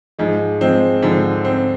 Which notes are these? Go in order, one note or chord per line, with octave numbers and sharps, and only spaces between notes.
G#2 F3 G#3
F3 G#3 C4
G#2 D3 F3
C4